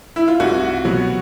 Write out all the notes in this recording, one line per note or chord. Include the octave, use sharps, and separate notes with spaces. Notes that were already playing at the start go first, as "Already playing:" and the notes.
E4
F4
C2 F#4
B2 F#3